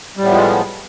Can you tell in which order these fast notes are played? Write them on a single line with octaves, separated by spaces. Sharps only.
G3 A2 B3 F3 G#3